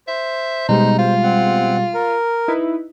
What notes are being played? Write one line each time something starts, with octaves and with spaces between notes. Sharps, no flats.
C5 E5
B2 G3 G#3 D#4
F4 C5
C4 F#5
A#4
D#4 E4 B4